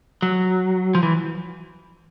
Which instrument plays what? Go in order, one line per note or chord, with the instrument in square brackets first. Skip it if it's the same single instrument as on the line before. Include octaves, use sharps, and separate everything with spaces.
[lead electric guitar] F#3
F3
E3